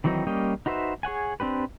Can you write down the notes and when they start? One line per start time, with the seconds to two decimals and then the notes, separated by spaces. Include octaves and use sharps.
0.04 D#3 E3 F#3 C4 D#4
0.27 G3 A#3 C#4 D#5 G5
0.66 D#4 F#4 B4 C5 E5
1.03 G#4 C#5 F#5 G#5
1.40 C4 D4 G4 B4